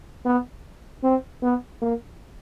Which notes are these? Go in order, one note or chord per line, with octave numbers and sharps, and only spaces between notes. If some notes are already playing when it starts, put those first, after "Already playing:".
B3
C4
B3
A#3